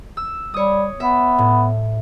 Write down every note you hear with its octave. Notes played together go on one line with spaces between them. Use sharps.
E6
G3 C#5 D#6
B3 E5
A2